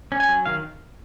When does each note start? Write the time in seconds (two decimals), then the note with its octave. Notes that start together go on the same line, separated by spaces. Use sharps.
0.12 C#4
0.20 G#5
0.29 F#3
0.46 D#3 F5